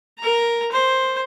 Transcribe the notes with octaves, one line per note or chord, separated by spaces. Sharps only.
A#4 A#5
C5